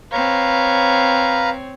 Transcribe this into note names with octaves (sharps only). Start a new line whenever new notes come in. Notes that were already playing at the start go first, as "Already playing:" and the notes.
C4 B4 C#5 F5 A#5